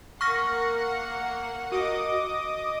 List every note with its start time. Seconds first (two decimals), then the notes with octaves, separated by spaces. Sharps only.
0.21 A#3 F#5 C#6 F6 A#6
1.72 F#4 D#5 D6 D#6